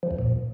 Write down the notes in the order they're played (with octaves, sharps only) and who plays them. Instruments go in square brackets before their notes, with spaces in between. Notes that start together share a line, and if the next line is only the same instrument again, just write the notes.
[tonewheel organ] F3
E2
A#2